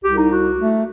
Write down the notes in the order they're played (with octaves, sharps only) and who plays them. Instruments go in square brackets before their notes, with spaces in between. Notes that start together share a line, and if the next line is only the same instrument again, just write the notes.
[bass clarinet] C2 [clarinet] G4
[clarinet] D#4
F#4
[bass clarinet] A3